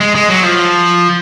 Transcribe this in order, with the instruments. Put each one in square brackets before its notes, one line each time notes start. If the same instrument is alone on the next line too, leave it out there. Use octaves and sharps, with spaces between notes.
[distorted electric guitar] G#3
G#3
F#3
F3